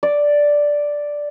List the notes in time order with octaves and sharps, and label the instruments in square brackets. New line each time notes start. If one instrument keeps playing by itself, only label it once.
[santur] D5